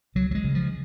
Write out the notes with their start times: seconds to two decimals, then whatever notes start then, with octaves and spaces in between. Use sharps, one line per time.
0.15 C#2 F#3
0.31 F#3
0.35 G#3
0.44 C#3
0.55 F3